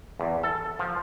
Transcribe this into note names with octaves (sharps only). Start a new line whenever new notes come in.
E2
A4
F3